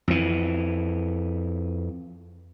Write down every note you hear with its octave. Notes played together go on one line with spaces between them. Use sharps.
F2 E3